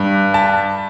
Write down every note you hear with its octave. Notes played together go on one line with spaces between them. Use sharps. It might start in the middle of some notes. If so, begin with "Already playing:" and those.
Already playing: G2
A5